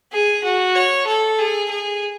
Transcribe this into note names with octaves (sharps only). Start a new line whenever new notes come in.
G#4
F#4
C#5
A4
G#4
G#4